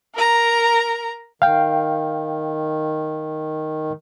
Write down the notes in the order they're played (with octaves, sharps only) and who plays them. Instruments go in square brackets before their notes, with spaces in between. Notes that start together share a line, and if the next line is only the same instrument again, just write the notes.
[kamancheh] A#4 A#5
[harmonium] D#3 [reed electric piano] F5 G5